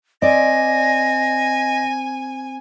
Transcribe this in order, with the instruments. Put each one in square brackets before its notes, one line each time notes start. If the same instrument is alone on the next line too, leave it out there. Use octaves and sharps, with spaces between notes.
[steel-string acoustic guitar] C4 D5 [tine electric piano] D#5 [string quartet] G#5 [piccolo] A#6